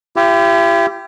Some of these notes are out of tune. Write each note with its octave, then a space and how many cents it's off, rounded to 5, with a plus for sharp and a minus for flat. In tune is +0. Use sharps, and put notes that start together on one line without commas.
E4 +45 G4 +0